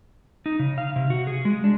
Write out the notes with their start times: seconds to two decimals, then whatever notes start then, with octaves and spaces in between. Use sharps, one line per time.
0.46 D#4
0.59 C#3
0.78 F5
0.96 C3
1.10 F#4
1.27 G#4
1.45 G#3
1.64 D4